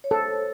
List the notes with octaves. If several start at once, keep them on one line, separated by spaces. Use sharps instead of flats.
C#5
A4 C5